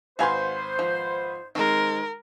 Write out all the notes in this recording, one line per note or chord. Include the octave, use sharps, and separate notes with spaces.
G#1 F#4 B4 C5 F5 G#5 C6
F3
D#3 G#3 C4 A#4